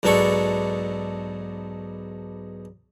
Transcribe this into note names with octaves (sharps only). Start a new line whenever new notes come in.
B1 G#2 B2 D4 A4 C#6